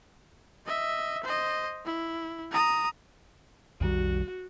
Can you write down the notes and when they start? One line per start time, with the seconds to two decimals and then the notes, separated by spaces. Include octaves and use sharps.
0.66 D#5 E5
1.24 C5 D#5
1.85 E4
2.51 A#5 D#6
3.81 B1 F2 D#3 G3 F#4